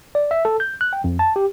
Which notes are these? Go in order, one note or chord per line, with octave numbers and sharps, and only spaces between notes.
D5
E5
A4
G6
F#6
G5
F2
A5
G4